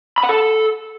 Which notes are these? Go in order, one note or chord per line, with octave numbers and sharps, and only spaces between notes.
B5
F#5
A4